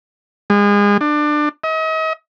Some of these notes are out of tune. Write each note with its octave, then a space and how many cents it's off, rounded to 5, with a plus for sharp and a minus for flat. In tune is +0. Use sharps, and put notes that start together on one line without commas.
G#3 -30
D4 +25
D#5 +40